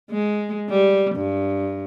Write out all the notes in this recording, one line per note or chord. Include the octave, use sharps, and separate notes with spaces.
G#3
G3
G2